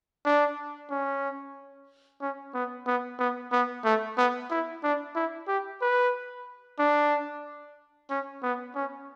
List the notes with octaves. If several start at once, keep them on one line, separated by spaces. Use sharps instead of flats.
D4
C#4
C#4
B3
B3
B3
B3
A3
B3
E4
D4
E4
G4
B4
D4
C#4
B3
C#4